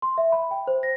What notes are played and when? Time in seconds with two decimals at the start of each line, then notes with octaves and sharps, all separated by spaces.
0.02 C6
0.18 E5
0.32 B5
0.51 G5
0.67 C5
0.83 A#6